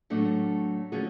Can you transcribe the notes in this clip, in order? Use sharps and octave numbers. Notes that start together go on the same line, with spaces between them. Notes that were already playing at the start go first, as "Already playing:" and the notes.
A2 F#3 A3 D4
D3 F3 A3 C#4 F#4 G#4